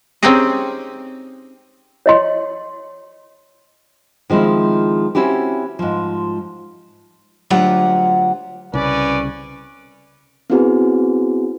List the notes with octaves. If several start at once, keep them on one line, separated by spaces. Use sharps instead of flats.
C4 C#4 D#4 G4 G#4 D#5
C#5 D#5 C6
D#3 F3 G#3 C4 E4
C4 C#4 E4 F#4 G4
G#2 F3
D2 F#3 F4 G4 F#5 A#5
C2 C#3 C#4 B4 D5
B3 C4 E4 F#4 G#4 B4